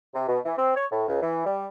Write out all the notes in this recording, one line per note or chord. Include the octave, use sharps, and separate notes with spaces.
C3
B2
E3
C4
C#5
A2
C#2
E3
G3